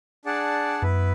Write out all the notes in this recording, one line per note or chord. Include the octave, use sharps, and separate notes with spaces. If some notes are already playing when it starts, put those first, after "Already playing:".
D4 G#4 D5 F#5 A5
F#2 B3 E4 B4